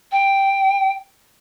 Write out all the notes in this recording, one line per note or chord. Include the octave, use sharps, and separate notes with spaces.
G5